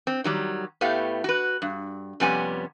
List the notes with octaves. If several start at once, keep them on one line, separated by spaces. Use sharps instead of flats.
C4
D#3 F#3 G3
A2 A3 B3 G4 F5
F#4 B4
G2
F2 C3 G3 B3 C#4 G#5